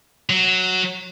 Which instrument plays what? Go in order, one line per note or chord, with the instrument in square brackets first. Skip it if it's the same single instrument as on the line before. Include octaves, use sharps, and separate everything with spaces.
[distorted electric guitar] F#3